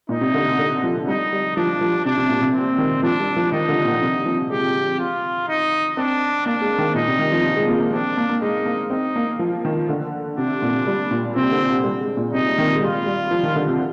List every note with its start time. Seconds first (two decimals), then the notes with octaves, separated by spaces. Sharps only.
0.09 A#2 D#4
0.21 C3
0.34 D3
0.47 C3
0.59 D3
0.84 F3
1.07 G3 D#4
1.33 G3
1.57 F3 D4
1.81 F3
2.05 C3 D4
2.17 C3
2.29 A#2
2.41 C3
2.55 C4
2.78 D#3
3.03 F3 D4
3.20 G3
3.36 F3
3.52 D#3 D#4
3.69 D3
3.85 A#2
4.02 C3
4.26 F3
4.50 G#3 G4
4.99 F4
5.48 D#4
5.97 C4 D4
6.46 A#3 D4
6.62 G#3
6.78 D#3
6.95 A#2 D#4
7.08 C3
7.19 D#3
7.32 F3
7.56 G#3
7.68 A#3
7.81 A#3
7.92 C4 D4
8.17 A#3
8.29 A#3
8.42 G#3 D#4
8.66 A#3
8.90 C4 D#4
9.16 A#3
9.39 F3
9.65 D#3
9.89 D3
10.37 C3 D4
10.62 A#2
10.87 G3
11.11 A#2
11.36 C3 C4
11.51 D3
11.84 G3
12.01 G#3
12.17 A#2
12.33 C3 D#4
12.58 D#3
12.76 G#3
12.82 G3 F4
13.06 G3
13.31 F3
13.43 D#3
13.56 D3
13.68 C3